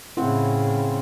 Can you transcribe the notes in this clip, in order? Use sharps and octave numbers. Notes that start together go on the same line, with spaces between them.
A2 C#3 C4 E4 F#5